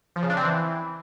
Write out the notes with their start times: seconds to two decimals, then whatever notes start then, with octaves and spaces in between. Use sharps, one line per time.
0.16 F3
0.23 C#3
0.30 D4
0.37 C4
0.44 E3